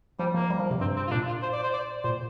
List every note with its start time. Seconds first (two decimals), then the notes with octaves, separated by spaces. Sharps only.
0.19 F3 G3
0.34 F3 A#3
0.50 G3
0.60 F3
0.71 C3
0.80 G2 C4
0.96 C4
1.07 F4
1.11 A#2 D4
1.27 F4
1.42 C5
1.53 D5
1.63 C5
1.73 D5
2.04 A#2 C5